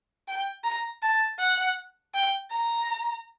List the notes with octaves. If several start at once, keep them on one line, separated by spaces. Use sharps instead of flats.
G5
A#5
A5
F#5
G5
A#5